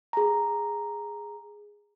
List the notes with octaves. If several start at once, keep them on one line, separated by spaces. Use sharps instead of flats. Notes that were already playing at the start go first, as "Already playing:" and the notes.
G#4 A#5